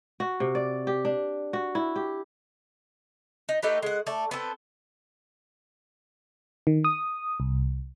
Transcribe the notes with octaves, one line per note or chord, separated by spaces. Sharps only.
F#4
C3
D5
G4
D4
F#4
E4
G4
D#4
A3 D#4 G4 B4
G#3 F#5
A3 D5
B3 C4 A4
D#3
D#6
C2